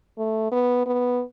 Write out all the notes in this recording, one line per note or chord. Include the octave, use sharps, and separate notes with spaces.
A3
B3
B3